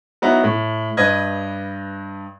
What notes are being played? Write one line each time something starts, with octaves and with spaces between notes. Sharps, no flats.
F#3 B3 D#4 E4
A2
G2 B4 D#5 G#6